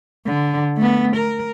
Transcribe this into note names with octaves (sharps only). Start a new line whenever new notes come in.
D3
A3 B3
A#4